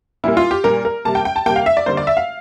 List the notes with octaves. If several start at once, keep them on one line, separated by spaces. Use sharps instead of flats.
A#2 G3 A#3 E4
F4
G4
A#2 G3 A#3 A#4
A#4
C3 G3 A#3 A5
G5
G5
A5
C3 G3 A#3 G5
F5
E5
D5
D3 G3 A#3 C5
D5
E5
F5